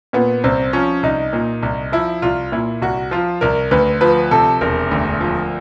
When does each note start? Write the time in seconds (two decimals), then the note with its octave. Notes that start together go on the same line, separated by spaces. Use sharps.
0.13 A#2 B3
0.44 C2 C4
0.73 F3 C#4
1.03 C2 D#4
1.33 A#2
1.63 C2
1.92 F3 E4
2.22 C2 F4
2.52 A#2 E4
2.82 C2 F#4
3.11 F3 F4
3.41 C2 A#4
3.71 D2 B4
4.01 F3 B4
4.31 C3 A4
4.61 E1 A#4
4.91 D2
5.20 F3